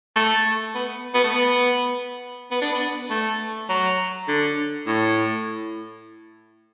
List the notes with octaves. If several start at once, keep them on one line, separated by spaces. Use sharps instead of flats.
A3
B3
B3
A3
B3
B3
D4
B3
A3
F#3
D3
A2